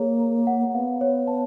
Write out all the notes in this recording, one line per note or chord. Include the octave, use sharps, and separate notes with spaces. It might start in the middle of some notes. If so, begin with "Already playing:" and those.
Already playing: A#3 G#4 C#5
A#4
F#5
B3 F5
C#5
A5